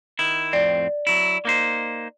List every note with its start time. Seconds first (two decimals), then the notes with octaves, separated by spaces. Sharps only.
0.19 D#3 E4
0.53 F2 A2 C4 D5
1.07 F#3 E4
1.45 A#3 D#4 C5